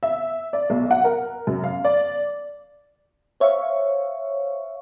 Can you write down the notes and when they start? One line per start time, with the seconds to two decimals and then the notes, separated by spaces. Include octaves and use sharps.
0.03 E5
0.53 D5
0.70 B1
0.91 F#5
1.04 A#4
1.47 F#2
1.64 F5
1.85 D5
3.40 C5 C#5 E5 F5 C#6